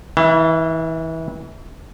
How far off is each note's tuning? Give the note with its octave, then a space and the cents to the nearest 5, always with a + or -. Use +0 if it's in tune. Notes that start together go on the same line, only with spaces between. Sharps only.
E3 -30 E5 +35